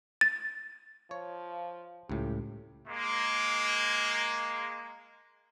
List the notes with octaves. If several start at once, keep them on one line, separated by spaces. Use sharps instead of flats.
A6
F3 C#5
C#2 A2 G4
G#3 A#3